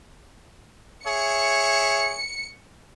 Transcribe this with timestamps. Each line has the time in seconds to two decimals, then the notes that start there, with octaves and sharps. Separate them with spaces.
1.06 G#4 C#5 E5 C#7